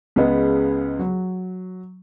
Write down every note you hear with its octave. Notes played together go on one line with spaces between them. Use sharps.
C#2 C#3 G#3 B3
F#3